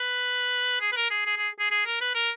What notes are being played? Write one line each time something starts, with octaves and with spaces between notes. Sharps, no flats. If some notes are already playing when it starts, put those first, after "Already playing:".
Already playing: B4
G#4
B4
A#4
G#4
G#4
G#4
G#4
G#4
A#4
B4
A#4